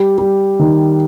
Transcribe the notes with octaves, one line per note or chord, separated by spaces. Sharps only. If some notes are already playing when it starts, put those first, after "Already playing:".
Already playing: G3
G3
D#3